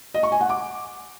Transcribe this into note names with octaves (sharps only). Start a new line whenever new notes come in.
D#5
C#6
G#5
F#5
D6